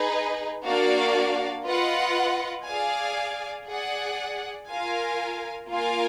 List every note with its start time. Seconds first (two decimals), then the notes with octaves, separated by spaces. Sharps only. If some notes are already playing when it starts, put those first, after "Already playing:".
Already playing: D#4 G#4 B4
0.65 A#3 D4 F#4 D5 F5
1.67 F4 B4 D#5 F#5
2.66 G#4 D5 F5 G#5
3.67 G#4 D5 F#5
4.69 F4 A#4 F5 G#5
5.69 A#3 F4 A#4 F5 G#5